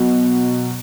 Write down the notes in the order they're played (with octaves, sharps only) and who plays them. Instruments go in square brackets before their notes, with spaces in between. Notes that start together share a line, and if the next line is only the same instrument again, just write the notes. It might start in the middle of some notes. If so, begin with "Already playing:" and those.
Already playing: [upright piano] B2 F#3